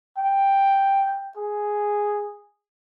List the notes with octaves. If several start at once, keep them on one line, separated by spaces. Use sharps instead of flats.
G5
G#4